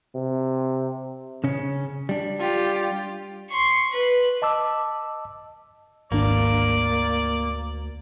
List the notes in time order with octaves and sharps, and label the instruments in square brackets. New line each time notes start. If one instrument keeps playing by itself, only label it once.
[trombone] C3
[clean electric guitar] C#3 C#4
G3 D4
[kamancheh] F4 G4
[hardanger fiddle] C6 C#6
B4
[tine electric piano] D#5 A5 D6 E6
[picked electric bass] G#1 D4 [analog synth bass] D2 [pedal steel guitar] A#3 [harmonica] D5